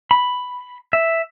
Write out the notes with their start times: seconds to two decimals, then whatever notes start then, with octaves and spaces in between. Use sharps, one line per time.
0.11 B5
0.93 E5